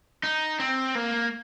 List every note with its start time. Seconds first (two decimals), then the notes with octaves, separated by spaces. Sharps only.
0.23 D#4
0.60 C4
0.95 A#3